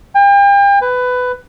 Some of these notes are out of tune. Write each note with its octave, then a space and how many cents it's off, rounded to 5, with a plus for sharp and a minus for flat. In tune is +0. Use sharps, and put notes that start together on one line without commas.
G5 +40
B4 +15